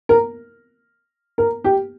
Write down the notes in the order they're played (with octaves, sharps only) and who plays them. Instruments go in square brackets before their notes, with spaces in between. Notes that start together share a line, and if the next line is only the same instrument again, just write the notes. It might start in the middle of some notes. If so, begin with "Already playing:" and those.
[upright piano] A#4
A#4
G4